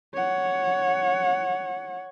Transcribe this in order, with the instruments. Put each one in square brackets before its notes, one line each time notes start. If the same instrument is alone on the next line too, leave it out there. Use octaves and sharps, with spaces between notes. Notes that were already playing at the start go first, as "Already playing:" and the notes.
[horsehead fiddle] C#5 F#5